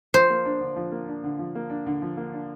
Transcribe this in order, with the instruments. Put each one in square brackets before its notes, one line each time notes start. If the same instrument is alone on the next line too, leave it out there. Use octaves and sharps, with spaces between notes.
[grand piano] F3 [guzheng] C5
[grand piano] A#3
D4
D3
F3
A#3
D4
D3
F3
A#3
D4
D3
F3
A#3
D4